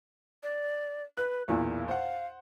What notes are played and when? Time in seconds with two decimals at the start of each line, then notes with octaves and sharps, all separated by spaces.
0.43 D5
1.17 B4 F#6
1.48 B1 E2 A#2 E4
1.88 C5 F5 F#5